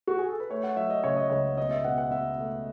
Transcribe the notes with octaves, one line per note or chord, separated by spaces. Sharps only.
F#4
G#4
A4
B4
A3 C#5
F#5
F#3 E5
D#5
C#3 C#5
D#5
C#2 C#5
B2 D#5
E5
B2 F#5
F#5
B2 E5
A3